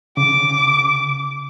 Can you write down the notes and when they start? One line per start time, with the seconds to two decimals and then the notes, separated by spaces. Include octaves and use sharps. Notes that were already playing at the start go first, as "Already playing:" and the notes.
0.17 C#3 D6